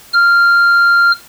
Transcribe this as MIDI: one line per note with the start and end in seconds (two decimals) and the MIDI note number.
0.13 1.11 89